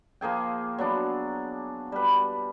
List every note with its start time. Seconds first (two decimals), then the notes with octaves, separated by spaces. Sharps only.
0.21 F3 A#3 G#4 G5
0.78 F#3 B3 D4
1.92 G3 B4